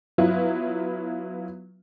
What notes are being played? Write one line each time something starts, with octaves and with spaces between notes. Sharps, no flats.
F#3 B3 E4 F4 B4